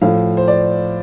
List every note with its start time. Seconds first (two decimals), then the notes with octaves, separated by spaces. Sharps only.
0.01 A2 F3 F5
0.37 C5
0.48 D5